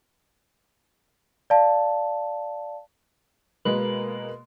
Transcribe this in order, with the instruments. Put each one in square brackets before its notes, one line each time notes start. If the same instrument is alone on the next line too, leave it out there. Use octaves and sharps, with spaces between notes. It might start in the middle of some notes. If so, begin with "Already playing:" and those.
[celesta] D5 F5 A5
[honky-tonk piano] B2 G#3 A#3 [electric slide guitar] B4